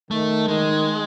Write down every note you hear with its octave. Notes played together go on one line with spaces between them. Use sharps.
D#3 A3
D#3 G#3